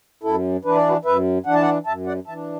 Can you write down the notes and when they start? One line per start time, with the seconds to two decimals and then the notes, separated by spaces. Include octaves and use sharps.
0.23 F#2 E4 A4
0.65 E3 D4 B4
0.76 D5
0.88 F#4 B4
1.05 F#2 B4 E5
1.46 E3 D4 F#5
1.54 A5
1.62 D5 F#5
1.86 F#2 E5 A5
2.07 D5 F#5
2.27 E3 E5 A5
2.32 D4